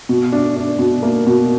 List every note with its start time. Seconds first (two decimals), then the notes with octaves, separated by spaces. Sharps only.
0.09 B2
0.32 D4
0.56 D4
0.79 B2
1.03 A#3
1.27 B2